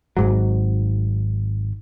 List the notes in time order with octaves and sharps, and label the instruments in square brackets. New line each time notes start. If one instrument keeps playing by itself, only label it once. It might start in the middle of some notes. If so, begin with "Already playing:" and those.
[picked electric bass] G#1 G#2 F#3